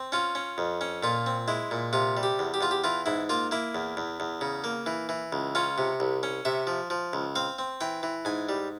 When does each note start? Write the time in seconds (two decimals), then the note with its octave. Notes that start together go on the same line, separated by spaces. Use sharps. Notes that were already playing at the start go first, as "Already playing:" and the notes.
Already playing: C4
0.12 C#4 F4
0.35 C#4
0.58 F2
0.81 C#4
1.03 A#2 F4
1.26 C4
1.48 G#3 E4
1.71 A#2
1.93 C3 F4
2.17 G3
2.23 G4
2.39 E2
2.54 G4
2.61 E2 F4
2.71 G4
2.84 E3 F4
3.06 G#2 E4
3.29 A#3 F4
3.51 A#3 E4
3.75 E2
3.97 E2
4.20 E2
4.41 C#3
4.64 A#3
4.86 E3
5.09 E3
5.33 C#2
5.55 C#4 F4
5.78 C3
6.00 C2
6.23 C#4
6.45 C3 E5
6.67 F3
6.90 F3
7.13 C#2
7.36 C4 F5
7.59 C4
7.81 E3 G5
8.03 E3
8.25 G#2 G#5
8.49 G3